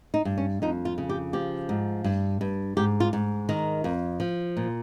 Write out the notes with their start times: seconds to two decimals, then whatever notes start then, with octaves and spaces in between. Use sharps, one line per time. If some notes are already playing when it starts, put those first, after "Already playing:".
0.14 D#4
0.25 G2
0.38 C#4
0.62 F2 D#4
0.85 F4
0.98 C#3
1.09 G4
1.33 F3 G4
1.69 G#2
2.04 G2
2.41 G2
2.77 G#2 G4
3.00 F4
3.13 G#2
3.49 D#3 A#4
3.84 F2
4.20 F3
4.57 A#2